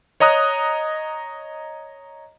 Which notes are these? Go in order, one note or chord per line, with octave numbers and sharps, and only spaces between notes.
C#5 D#5 A#5 D#6 F#6